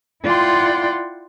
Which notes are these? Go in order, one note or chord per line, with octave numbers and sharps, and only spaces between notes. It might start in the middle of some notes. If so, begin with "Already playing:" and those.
E4 F4 D5 F#5 G5 C6